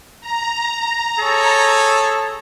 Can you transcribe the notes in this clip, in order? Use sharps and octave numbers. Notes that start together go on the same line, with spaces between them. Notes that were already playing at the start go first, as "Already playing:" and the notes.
A#5
G#4 A4 C#5